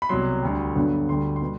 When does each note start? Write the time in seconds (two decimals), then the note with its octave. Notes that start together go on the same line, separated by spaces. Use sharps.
0.02 B5
0.09 C2 B2 F#3 C6
0.42 D2 D3 G3
0.75 G2 D3 F#3 B3
1.09 D2 D3 G3 C6
1.36 C6
1.41 B2 G3 B3